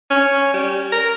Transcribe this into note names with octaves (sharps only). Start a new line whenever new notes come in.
C#4
G3
A#4